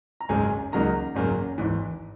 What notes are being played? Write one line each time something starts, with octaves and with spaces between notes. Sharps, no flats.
A#5
G#1 F#2 C#3 G#3 G#5
C#2 C#3 F#3 A#3 D#4 A#5
G#1 F#2 C#3 F#3 A#3
G#1 G#2 E3